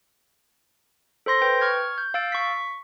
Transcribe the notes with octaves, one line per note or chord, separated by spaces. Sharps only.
A4 C5 C6 A#6
B4 G5 G6 D7
C#6 F6 G#6
G6
F5 E6 A6 D7
C#6 B6